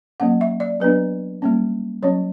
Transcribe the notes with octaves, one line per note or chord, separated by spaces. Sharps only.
F#3 A#3 C#4 F#5
E5
D5
F#3 B3 D4 B4
G3 A#3 C#4
F#3 C#4 C#5